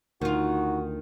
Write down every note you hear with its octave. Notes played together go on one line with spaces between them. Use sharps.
D2 D#3 D#4 F4 F#4